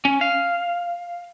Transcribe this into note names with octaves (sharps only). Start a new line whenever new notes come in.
C#4
F5